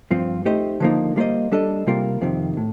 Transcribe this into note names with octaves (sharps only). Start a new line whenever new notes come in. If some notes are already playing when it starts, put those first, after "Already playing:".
G2 F3 C4 F4
A3 D#4 G4 C5 D#5
D3 F3 A#3 D#4
G3 A#3 F4 C5 D#5
G3 D4 A4 D#5
C3 G3 A#3 F4 A#4
F2 C3 D#3
A2